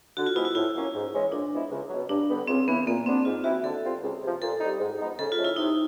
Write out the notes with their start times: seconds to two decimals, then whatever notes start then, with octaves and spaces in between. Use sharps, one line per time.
0.17 D3 F#4
0.26 F4
0.36 F3 G#3 B3 E4
0.45 F4
0.55 A2 E4
0.74 F#3 A#3 C#4
0.94 G#2
1.13 E3 G#3 C#4
1.31 A#2 D4
1.51 F3 G#3 B3 E4
1.71 C#2
1.89 B2 F#3
2.09 G2 D4
2.29 D3 G3 B3
2.48 C#2 C4
2.68 C#3 E3 B3
2.86 A#2 A#3
3.05 F3 G#3 B3 C4 D4
3.25 G#2 F4
3.44 E3 G#3 C4 E4 F#4
3.63 D3 A4
3.83 G3 C4 F4
4.02 C#2
4.22 C3 F3
4.41 A#2 A4
4.60 G3 C4 D#4
4.80 G#2
4.99 F3 G#3 B3 D#4
5.19 C#3 A4
5.32 F4
5.37 F3 A3 C#4
5.45 E4
5.56 C3 D#4